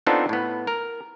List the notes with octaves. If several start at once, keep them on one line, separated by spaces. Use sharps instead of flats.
B3 C4 D4 D#4 F4 A4
A2 B3
A#4